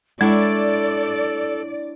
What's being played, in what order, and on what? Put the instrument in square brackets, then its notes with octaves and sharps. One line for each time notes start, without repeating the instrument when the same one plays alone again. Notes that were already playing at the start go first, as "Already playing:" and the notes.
[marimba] G#3 [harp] D4 E4 C#5 [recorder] A4 [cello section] D5